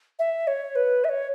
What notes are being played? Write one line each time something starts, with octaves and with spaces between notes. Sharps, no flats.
E5
C#5
B4
E5
C#5